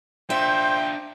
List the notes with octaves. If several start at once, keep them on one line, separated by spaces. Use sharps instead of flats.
D4 F4 C5 E5 G5